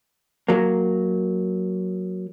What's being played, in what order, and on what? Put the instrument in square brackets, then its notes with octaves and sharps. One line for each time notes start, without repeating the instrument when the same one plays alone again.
[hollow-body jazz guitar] F#3 A#3